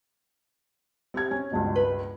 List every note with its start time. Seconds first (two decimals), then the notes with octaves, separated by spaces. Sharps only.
1.14 C4 G4 G#6
1.31 C#4
1.51 C#2 G2 B2
1.76 B4